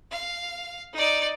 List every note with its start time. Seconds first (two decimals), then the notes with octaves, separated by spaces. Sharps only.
0.11 F5
0.93 D#4 D5